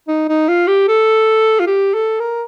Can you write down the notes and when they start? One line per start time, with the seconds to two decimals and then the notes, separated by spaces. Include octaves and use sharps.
0.08 D#4
0.29 D#4
0.48 F4
0.68 G4
0.88 A4
1.60 F4
1.67 G4
1.94 A4
2.20 A#4